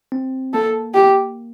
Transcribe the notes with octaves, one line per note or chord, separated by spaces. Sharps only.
C4
A#3 A4
G4